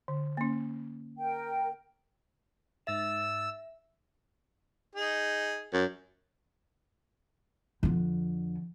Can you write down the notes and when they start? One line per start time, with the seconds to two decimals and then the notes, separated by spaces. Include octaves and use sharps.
0.08 D3
0.37 A#3 C#4
1.18 A#4 G5
2.87 G#2 E5 E6 A6
4.96 D#4 G#4
5.73 F#2
7.83 F2 D3